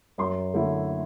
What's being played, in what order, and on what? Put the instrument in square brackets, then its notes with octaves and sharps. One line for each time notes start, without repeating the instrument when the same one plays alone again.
[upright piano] F#2 C6
D3 A3 E4